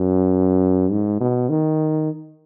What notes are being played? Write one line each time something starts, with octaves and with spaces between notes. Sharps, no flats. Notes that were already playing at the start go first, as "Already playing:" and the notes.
Already playing: F#2
G#2
B2
D#3